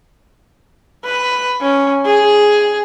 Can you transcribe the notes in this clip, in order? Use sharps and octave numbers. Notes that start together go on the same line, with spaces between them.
B4
C#4
G#4